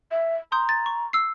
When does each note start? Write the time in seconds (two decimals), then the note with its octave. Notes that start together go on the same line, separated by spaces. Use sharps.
0.11 E5
0.52 A#5 C6 D#6 G6
0.69 A6
0.86 C#6
1.13 E6 C7